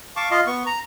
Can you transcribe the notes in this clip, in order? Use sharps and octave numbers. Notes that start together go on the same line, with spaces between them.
F5 A5 C#6 D6
F4 D#5 F5
B3 C#6
A#5